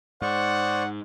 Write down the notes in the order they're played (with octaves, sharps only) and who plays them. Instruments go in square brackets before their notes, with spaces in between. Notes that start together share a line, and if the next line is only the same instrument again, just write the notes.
[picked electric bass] G#2 [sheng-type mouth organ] C5 D5 C#6 [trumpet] F#5